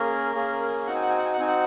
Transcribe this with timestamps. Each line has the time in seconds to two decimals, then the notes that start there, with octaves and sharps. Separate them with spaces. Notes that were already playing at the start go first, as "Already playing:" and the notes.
Already playing: A#3 C#4 G#4 A#4
0.35 A#3 C#4 G#4
0.86 C4 D#4 F#4 F#5
0.95 G#5
1.02 F#5
1.09 G#5
1.18 F#5
1.25 G#5
1.33 F#5
1.38 C4 D#4 F#4 G#5
1.48 F#5